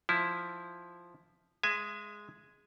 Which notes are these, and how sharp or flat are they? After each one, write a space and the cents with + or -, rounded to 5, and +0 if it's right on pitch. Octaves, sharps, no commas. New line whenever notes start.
F3 +0 E4 +0
G#3 +0 E5 +30 G#5 +0